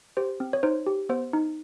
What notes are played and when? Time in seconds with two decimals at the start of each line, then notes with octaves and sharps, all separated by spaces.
0.17 G4 C5
0.40 C4
0.53 C#5
0.63 D#4 C5
0.87 G4
1.09 B3 C5
1.33 D#4